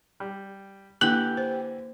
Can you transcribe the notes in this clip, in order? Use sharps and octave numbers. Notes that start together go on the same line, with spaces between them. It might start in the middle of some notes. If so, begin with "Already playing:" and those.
G3
D3 E3 A#3 G4 F#6
C5